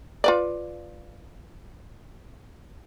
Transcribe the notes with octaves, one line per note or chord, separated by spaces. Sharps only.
F4 B4 D5